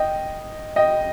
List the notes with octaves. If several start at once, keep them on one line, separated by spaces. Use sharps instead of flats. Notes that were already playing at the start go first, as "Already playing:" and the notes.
Already playing: D#5 G5
D#5 G5